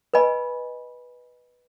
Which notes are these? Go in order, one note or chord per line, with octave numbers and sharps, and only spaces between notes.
B4 D#5 G#5 B5